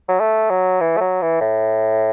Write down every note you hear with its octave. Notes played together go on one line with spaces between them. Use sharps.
F#3
A3
F#3
E3
A3
F#3
E3
A2